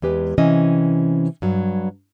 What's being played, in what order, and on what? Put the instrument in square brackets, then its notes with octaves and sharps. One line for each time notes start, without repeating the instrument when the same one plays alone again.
[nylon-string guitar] E2 G#3 G4 B4
C3 E3 C#4 D#5
G2 F#3